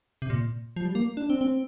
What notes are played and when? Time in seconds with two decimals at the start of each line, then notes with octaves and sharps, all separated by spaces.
0.22 C3
0.30 A#2
0.76 F3
0.85 G3
0.95 A#3
1.17 D4
1.30 C4
1.41 C4